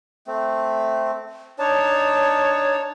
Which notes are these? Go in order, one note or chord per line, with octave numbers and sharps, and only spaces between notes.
A3 C4
D4 D#4 C#5 A5